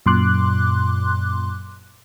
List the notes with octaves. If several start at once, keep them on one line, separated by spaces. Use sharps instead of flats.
F#2 A#2 C6 D6 F#6